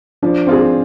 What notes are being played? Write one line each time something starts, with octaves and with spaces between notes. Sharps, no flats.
F3 D4
C4 F4 G#4